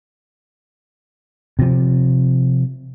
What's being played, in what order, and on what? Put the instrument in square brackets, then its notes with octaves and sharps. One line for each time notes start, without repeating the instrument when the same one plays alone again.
[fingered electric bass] C3 F3